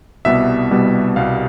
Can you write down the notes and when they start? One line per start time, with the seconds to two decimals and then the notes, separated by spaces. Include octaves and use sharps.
0.25 C2 B2 G3 B3 E5
0.71 C2 B2 G3 B3
1.16 C2 B2 G3 B3 F5